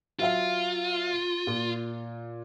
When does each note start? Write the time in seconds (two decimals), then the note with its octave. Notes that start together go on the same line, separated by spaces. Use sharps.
0.19 F#3 F4 E5 F5
1.47 A#2